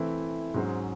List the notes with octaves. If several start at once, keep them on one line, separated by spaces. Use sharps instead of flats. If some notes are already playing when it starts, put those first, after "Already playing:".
Already playing: E3 A3 C4 E4
G#2 F#3 C#4 G#4 C5